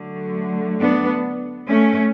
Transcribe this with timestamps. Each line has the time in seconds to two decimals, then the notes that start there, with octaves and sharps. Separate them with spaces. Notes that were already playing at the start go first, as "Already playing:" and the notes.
Already playing: D3 F#3 A3
0.80 B3 D4
1.70 A3 C#4